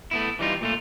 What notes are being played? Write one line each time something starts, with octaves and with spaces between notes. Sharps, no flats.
A3 B3 E4
E3 G3 D#4 F4
A#2 A3 F4